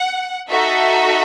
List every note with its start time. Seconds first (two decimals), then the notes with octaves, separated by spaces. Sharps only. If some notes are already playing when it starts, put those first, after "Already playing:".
Already playing: F#5
0.49 D#4 F#4 A4 E5